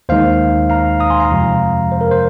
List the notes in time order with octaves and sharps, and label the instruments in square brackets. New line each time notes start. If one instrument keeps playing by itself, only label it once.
[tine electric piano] D#2 D#3 G#3 D#4 C5 F5
F5 A#5
A#5 D#6
G#5 C6
F5 A#5
F2 C3 F3 G#3
C5
A#4
C5